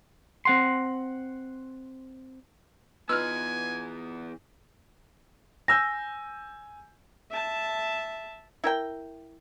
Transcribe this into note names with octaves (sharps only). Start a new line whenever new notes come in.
C4 F#5 C6
E3 B3 D#4 F4 B4 G#5 E6 F6
G#5 E6 G6 A#6
E5 A5
E4 A#4 G5